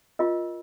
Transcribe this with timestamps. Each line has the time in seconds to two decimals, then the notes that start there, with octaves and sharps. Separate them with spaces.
0.19 F4 A#4 D#5